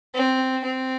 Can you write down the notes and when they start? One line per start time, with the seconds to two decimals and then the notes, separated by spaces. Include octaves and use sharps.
0.14 C4
0.64 C4